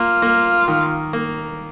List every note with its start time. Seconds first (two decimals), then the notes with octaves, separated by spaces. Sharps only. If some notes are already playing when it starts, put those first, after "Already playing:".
Already playing: A#3 F4
0.22 A#3
0.68 D#3
1.13 A#3